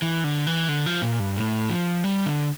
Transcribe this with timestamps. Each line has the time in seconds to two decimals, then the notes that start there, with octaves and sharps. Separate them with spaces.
0.02 E3
0.24 D3
0.47 E3
0.69 D3
0.86 F3
1.02 A#2
1.20 G2
1.36 A2
1.70 F3
2.04 G3
2.26 D3